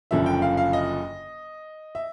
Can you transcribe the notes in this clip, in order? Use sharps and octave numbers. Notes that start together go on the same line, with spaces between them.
F#1 F#2 D3 F3 E5
G5
F5
F5
D#5
E5